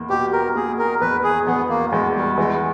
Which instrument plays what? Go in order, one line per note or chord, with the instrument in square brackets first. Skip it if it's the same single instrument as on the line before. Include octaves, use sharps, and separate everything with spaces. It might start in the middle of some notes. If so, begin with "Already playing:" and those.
Already playing: [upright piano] E2 A#3
[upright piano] B2 [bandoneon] G4
[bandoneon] A#4
[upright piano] A#3 [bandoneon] G#4
[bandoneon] A#4
[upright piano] E2 [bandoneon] B4
[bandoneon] G#4
[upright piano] E2 [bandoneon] B3
[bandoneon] A#3
[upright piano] E2 [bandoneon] G#3
[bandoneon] G3
[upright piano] E3 [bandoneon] G#3